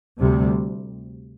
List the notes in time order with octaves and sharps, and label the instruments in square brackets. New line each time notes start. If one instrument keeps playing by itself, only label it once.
[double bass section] D2 C3 G3